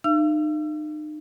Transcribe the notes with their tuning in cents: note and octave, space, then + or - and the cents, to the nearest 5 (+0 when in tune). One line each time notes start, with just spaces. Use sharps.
D#4 -40 F5 -45 E6 +35